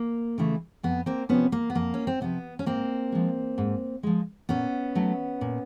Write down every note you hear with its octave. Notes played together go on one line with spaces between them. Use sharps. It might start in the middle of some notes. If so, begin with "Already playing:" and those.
Already playing: A#3
C#3 E3 A3
F2 B3
A#3 C4
C3 F3 B3 C#4
A#3
B3
F2 A#3
C#4
C4
C3 F3 B3
C#4
G#2 A#3 C4
F3 G#3
G#2
F3 G#3
A#2 B3 C#4
F#3 A3
A#2